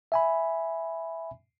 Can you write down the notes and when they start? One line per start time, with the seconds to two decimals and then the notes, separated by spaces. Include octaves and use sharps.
0.12 E5 G#5 B5